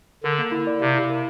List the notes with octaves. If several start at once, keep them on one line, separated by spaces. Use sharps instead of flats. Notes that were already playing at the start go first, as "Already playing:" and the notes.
D3 A#4
A#3
E4
D5
C3 F5
E4
A#4